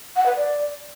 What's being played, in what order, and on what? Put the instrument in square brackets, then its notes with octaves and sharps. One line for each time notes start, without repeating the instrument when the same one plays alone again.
[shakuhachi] F#5
B4
D5